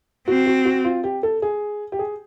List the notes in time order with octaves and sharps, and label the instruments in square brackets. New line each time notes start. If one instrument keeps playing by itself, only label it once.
[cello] C4 [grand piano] F#4
[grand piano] F#4
F#4
F4
G4
A4
G#4
G4
G#4